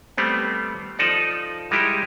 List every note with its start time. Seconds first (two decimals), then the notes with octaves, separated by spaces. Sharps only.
0.17 G3 A3 B3 C4
0.99 F3 D#4 A4 D5
1.71 G3 G#3 D#4 E4 G4